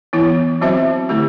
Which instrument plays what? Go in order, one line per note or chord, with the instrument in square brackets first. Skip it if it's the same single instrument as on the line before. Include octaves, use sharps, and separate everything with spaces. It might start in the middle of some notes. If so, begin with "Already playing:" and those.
[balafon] E3 B3 E4
F#3 C4 F#4 C5 E5
D3 A3 E4 G4